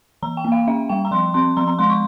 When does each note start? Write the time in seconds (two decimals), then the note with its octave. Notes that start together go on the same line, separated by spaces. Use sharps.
0.22 E3 A#5
0.37 G5
0.44 A#3
0.52 F5
0.67 C#4 E5
0.89 G3 G5
1.05 A#5
1.11 F3 C6
1.34 C4 C6
1.57 F3 A#5
1.68 A#5
1.79 G#3 C6
1.90 C#6